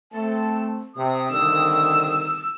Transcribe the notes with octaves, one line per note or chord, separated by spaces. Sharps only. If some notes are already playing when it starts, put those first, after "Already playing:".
A3 C4 A5
C3 D#6
C2 D3 D#3 E6